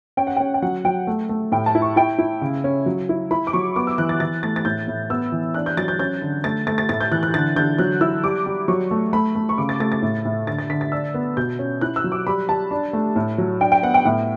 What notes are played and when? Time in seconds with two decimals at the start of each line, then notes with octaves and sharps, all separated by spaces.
0.17 C#4 G5
0.27 F#5
0.36 C#4 G5
0.54 G5
0.62 F#3 F#5
0.85 F#3 G5
1.07 A3
1.29 A3
1.52 A2 G5
1.66 A5
1.75 E4
1.82 C#6
1.96 E4 G5
2.19 E4
2.42 C#3
2.64 C#4
2.86 F#3
3.09 E4
3.31 E4 B5
3.47 D6
3.53 F#3 C#6
3.76 B3 D6
3.87 E6
3.98 E3 F#6
4.09 A6
4.20 E3 A6
4.43 A3 A6
4.56 A6
4.65 A2 G6
4.88 A2
5.10 B3 E6
5.32 E3
5.54 D4 F#6
5.66 G6
5.77 F#3 A6
5.88 G6
5.99 C#4 G6
6.22 D3
6.44 A3 A6
6.67 A3 A6
6.78 A6
6.89 A2 A6
7.01 G6
7.12 E3 F#6
7.23 F#6
7.34 D3 A6
7.56 D3 G6
7.78 F#3 F#6
8.01 E4 E6
8.23 G3 D6
8.46 G3
8.68 F#3 C#6
8.91 A3
9.13 A3 B5
9.35 A3
9.49 C#6
9.58 C#3 D6
9.69 A6
9.80 A3 A6
9.92 A6
10.02 A2
10.25 A2
10.47 D3 A6
10.58 A6
10.70 D3 B6
10.81 A6
10.92 D4 E6
11.14 B3
11.37 B2 G6
11.59 C#4
11.81 E4 F#6
11.96 E6
12.04 F#3
12.12 D6
12.27 G3 B5
12.49 G3 A5
12.71 D4
12.93 A3
13.16 A2
13.38 F#3
13.61 D4 G5
13.72 G5
13.83 B3 F#5
13.94 G5
14.05 A2 G5